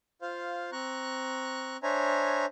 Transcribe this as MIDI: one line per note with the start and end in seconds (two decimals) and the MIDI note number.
0.22 0.70 65
0.22 0.70 72
0.22 0.70 77
0.72 1.77 60
0.72 1.77 82
0.72 1.77 85
0.72 1.77 90
1.83 2.46 62
1.83 2.46 72
1.83 2.46 73
1.83 2.46 76
1.83 2.46 80
1.83 2.46 82